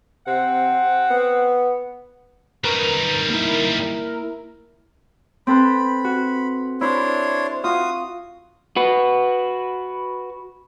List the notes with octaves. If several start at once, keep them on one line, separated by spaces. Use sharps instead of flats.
C3 C4 F#5
B3
G3 D#4 A#4 B4 C#6
A#3 E4
C4 A4 B4 B5
F#4
D4 E4 C5 C#5
F4 F#4 D#6
F#4 B4